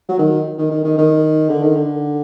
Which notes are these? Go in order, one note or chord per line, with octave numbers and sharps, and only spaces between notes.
F#3
D#3
D#3
D#3
D#3
D#3
D3
D#3
D3